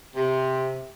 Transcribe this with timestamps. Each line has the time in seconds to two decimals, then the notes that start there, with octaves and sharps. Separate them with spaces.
0.16 C3